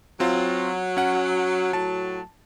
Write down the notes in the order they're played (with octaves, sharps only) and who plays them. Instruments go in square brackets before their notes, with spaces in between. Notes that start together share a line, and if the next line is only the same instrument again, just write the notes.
[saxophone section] F#3 [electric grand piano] C4 F4
[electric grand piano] C#4 F#5
[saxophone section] A2 F#3 [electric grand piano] A5